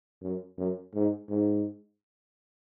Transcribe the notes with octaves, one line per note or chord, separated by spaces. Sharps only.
F#2
F#2
G#2
G#2